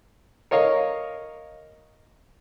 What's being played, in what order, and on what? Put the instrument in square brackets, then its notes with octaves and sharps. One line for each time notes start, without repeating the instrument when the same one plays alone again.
[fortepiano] A#4 C#5 D#5 F5